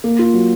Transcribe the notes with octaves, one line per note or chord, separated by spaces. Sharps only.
A#3
F4
F#3